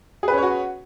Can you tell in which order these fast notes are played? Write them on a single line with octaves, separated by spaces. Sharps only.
G#4 B4 C#4 C#5 F#4